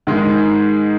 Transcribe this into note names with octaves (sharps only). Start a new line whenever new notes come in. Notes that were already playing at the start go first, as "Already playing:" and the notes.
G#2 D#3 G#3